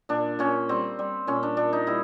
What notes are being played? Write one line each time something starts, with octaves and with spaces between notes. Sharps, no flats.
A#2 D4
A#2 C#4
G3 C4
G3
A#2 C#4
D4
A#2 D4
D#4
G3 E4